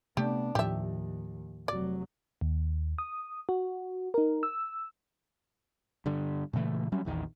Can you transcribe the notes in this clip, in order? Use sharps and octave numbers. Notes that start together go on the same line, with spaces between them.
C3 A3 B3 D4 G4
D#2 A2 F3 G4 E5
F1 F#3 D5
D#2
D#6
F#4
D#4 A#4
E6
G2 D3
A#2 C#3 E3 A3
F#3 G3 C#4
A#1 E2 D#3